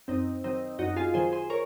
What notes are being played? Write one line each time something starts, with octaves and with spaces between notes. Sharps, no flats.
F#2 C4 D#4
D#3 F#3 C4 D#4
F#2 D#4 F#4
F4 G#4
D#3 F#3 G#4 C5
G#4 C5
A#4 C#5